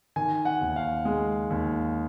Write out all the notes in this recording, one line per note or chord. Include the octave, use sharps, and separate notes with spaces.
D#3 G#5
F#5
D#2
F5
G#3
D#2